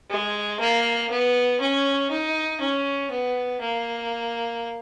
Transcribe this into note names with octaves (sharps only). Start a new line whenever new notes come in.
G#3
A#3
B3
C#4
D#4
C#4
B3
A#3